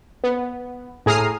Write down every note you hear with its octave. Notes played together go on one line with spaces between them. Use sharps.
B3
A2 G#4 A#5 D#6 F6 C7